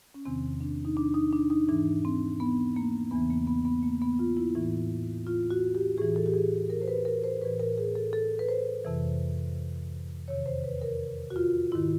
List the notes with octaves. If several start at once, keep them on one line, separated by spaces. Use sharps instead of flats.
C#4
E2 C3 D#3 C4
D4
D#4
D4
D#4
D4
D#4
G#2 E3 D4
C4
B3
A#3
E2 C#3 E3 B3
A#3
B3
B3
A#3
B3
F4
E4
A2 E3
F4
F#4
G4
A2 E3 G#4
A4
G4
G#4
A#4
C5
B4
A#4
C5
A2 E3 B4
A#4
G#4
A4
A4
B4
C5
F2 C3 E3
E2 C3 D#3 C#5
C5
B4
A#4
F#4
F4
G#2 D#3 E4